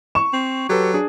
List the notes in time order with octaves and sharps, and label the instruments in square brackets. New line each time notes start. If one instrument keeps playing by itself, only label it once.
[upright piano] C#6 [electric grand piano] E7
[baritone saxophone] C4
[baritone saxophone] F#3 [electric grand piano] G4 A4 B4
[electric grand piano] D4 G#4